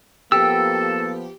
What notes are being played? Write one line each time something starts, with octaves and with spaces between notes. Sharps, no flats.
F3 A#3 B3 G4 A4 E6